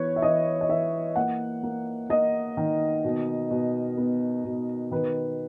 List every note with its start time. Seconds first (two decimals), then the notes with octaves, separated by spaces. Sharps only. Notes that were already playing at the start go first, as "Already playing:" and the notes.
Already playing: E3 B3 B4 C#5
0.16 E5
0.22 E3 D#5
0.61 D#5
0.69 E3 E5
1.15 A#3 F#5
1.63 A#3
2.09 A#3 D#5
2.57 D#3
3.04 B2
3.51 B2
3.97 B3
4.45 B2
4.91 D#3 B4